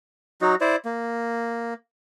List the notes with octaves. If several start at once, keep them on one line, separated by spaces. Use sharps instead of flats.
F#3 D#4 F#4
E4 C5 D5
A#3